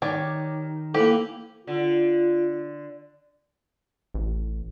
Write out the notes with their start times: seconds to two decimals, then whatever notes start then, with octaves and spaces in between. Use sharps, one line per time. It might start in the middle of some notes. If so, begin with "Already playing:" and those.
0.02 D#3 G4 C#5 D5
0.94 E3 A#3 G4 A4
1.67 D3 F4
4.14 A1